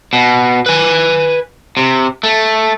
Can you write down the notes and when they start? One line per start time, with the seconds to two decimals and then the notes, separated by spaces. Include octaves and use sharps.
0.13 B2
0.66 B4 G#5
1.77 C3
2.23 A3